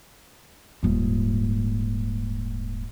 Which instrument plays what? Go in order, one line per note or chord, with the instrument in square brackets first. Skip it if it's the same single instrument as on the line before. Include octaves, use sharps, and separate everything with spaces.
[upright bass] D#1 G#2